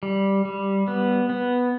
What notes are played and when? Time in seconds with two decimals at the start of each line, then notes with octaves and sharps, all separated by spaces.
0.03 G3
0.45 G3
0.88 B3
1.30 B3